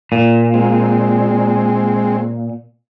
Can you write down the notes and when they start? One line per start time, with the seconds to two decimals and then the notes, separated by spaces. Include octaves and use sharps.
0.12 A#2
0.54 G#3 C4